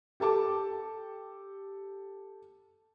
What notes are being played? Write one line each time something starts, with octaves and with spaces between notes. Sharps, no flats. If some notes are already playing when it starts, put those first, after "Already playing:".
G4 A4 A5 D6